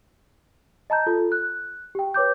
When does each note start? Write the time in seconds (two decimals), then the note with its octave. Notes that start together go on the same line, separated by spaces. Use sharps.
0.90 D#5 A5 A#5 G6
1.06 F4 A4
1.32 F#6
1.95 G4 G5
2.14 B4 C#5 D6 G6